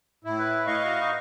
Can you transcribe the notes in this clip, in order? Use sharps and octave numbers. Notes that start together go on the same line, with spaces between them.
A2 E4
B4
D#5 F5 C#6
F#4
D#4